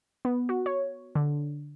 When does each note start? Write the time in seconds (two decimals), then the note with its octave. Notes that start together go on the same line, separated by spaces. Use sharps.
0.25 B3
0.49 F#4
0.66 C#5
1.15 D3